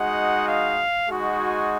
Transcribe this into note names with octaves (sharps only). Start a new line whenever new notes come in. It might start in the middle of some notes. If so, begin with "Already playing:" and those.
Already playing: G#3 D#4 F#4 F#5
F5
G#3 D#4 F#4
G#5